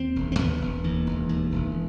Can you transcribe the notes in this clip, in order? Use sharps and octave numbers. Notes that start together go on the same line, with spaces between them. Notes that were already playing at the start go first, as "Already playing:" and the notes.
Already playing: D#2 C4
E1
C4
D#2 B3
E1
D#2
E1
D#2
E1